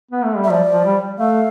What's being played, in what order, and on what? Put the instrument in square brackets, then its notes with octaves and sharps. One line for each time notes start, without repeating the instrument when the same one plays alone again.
[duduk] B3
A3
G3
[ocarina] E5
[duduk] F3 [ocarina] D5
[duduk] F3
G3
[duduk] A3 [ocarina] F5